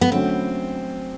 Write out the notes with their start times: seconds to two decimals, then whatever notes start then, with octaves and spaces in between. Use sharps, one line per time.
0.01 B3
0.12 D3 F#3 A3 C4 C#4